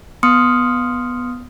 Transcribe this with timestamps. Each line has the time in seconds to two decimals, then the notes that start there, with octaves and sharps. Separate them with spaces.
0.23 B3 C6 D#6 F6 C#7